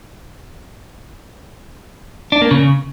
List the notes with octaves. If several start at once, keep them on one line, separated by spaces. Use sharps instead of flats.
D4
A#3
C#3